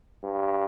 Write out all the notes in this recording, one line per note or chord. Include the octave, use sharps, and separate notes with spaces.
G2